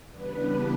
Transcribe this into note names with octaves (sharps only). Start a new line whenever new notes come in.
C#3 E3 G3 B3 D4 B4